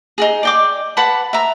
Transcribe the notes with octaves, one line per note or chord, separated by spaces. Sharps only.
D#4 F#4 G#4
D5 G5 D6
B4 F#5 A5 B5
E5 A#5